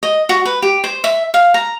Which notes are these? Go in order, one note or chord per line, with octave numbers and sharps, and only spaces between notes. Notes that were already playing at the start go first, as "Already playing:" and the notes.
D#5
F#4
B4
G4
C5
E5
F5
A#5